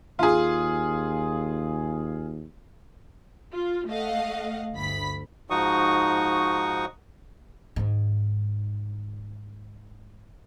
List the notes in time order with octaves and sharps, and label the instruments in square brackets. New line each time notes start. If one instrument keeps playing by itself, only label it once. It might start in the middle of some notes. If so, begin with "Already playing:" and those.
[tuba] D#2 [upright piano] F4 G#4
[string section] F4
A3 D#5 F5 F#5
G1 D2 B5 B6
[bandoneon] G#2 F3 D#4 F#4 C#6 D#6
[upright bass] G#2 D#3